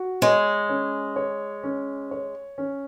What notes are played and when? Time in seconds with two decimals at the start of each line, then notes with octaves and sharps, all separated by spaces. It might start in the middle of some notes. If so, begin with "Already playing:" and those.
Already playing: F#4
0.22 G#3 C#5
0.69 C#4
1.16 C#5
1.63 C#4
2.11 C#5
2.58 C#4